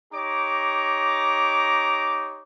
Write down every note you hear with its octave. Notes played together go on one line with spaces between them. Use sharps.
D#4 G4 C#5 A#5 D6